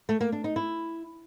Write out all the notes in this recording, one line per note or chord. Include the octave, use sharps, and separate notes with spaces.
A3
A#3
D4
D#4
E4